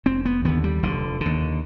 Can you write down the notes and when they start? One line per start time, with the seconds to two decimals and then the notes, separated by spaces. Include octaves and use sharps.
0.06 F1 C4
0.25 B3
0.45 D#2 D3 B3
0.64 G3
0.83 F1 D3
1.21 D3
1.26 D#2